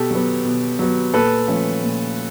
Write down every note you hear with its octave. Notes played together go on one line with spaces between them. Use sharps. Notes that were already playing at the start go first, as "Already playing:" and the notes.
Already playing: B2 G4 A4
F#3 B3
B2
F#3 B3
A#2 A4 B4
F3 A3 C#4
A#2